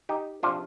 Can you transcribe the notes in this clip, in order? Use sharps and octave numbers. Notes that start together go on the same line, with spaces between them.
D#4 G4
C3 F3 D4 F4